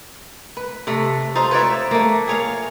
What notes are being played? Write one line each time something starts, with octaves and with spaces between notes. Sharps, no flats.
B4
C3 A3
D#4 F4 C5
B4 C#5 D5 E5
A3 A#3
G#4 C#5 F5